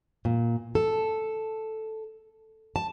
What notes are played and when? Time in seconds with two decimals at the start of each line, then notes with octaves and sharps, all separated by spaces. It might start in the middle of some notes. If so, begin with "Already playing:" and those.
0.25 A#2
0.75 A4
2.76 A5